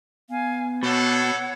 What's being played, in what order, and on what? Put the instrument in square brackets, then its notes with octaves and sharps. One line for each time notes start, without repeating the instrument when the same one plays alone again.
[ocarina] B3 [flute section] F5 G#5
[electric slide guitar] B2 [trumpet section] G3 D4 A4 [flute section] C#5 F#5